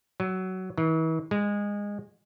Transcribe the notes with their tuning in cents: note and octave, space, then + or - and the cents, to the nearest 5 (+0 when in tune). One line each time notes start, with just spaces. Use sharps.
F#3 +15
E3 -40
G#3 -20